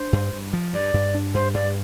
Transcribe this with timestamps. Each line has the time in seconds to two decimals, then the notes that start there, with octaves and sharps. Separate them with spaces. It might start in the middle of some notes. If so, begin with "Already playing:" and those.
Already playing: D4 C5
0.13 G2
0.32 G2
0.53 F3
0.73 G2 D5
0.94 G2
1.14 D4
1.34 G2 C5
1.54 G2 D5